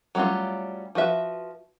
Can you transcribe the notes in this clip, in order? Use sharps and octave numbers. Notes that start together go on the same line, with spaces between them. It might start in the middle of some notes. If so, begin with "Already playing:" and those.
F#3 G3 A3 C#4 F4
F3 F#4 B4 E5